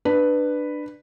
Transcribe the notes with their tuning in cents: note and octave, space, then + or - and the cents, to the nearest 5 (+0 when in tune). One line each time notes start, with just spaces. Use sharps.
D4 +20 B4 +0